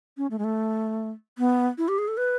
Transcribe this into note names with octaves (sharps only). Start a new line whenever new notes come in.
C#4
A3
G#3
A3
B3
E4
G4
G#4
A4
B4